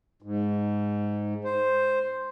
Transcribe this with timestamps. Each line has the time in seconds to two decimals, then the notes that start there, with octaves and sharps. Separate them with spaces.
0.22 G#2
1.45 C5